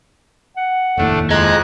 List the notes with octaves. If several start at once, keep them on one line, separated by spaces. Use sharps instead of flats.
F#5
F1 D#2 A2 A3 D4
F2 G#4 D#5 A#5 F#6